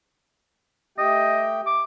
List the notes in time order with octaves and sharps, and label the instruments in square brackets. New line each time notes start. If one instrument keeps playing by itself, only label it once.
[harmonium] A3 G4 G5 [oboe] D#5
[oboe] D6